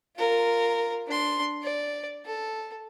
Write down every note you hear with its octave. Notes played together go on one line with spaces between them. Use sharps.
F4 A#4
D4 C6
D5
A4